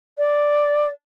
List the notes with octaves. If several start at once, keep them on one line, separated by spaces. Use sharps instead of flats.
D5